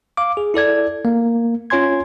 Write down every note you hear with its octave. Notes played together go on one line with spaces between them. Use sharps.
F5 D6
G#4
E4 A4 D5 G#6
A#3
C#4 F4 C#5 G#5 C6 G#6